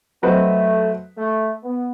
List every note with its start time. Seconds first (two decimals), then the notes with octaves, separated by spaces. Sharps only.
0.23 F#3 A3 C4 F#4 B4 D#5
1.16 A3
1.63 B3